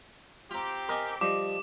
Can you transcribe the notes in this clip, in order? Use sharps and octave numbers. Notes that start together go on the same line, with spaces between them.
C4 F4 G4 A#5
A#4 D#5 G#5 D6
F3 G3 D#5 D6